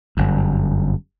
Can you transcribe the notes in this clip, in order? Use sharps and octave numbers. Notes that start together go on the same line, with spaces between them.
G1 F#2